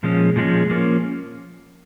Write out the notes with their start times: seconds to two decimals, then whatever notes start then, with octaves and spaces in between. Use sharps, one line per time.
0.03 A#2 F3 G#3 C#4
0.36 A#2 F3 G#3 C#4
0.70 F3 A#3 C#4